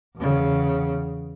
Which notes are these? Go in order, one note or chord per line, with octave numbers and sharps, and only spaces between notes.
E2 C#3